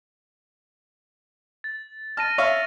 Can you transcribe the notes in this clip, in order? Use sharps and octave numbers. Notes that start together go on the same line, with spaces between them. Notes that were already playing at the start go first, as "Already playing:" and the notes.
A6
A5 F6 A#6 D#7
C#5 E5 F5